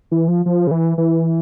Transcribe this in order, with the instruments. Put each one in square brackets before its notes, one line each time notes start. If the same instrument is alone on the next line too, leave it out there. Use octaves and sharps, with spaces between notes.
[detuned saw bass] E3
F3
F3
C#3
E3
E3